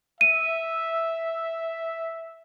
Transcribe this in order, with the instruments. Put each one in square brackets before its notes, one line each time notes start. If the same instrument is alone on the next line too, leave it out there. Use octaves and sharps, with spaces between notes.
[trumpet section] E5 [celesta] D#7